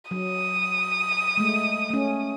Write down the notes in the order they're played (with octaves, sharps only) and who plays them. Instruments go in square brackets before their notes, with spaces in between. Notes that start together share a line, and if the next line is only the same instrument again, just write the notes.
[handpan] F#3 [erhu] D#6
[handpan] G#3 A3
A3 C#4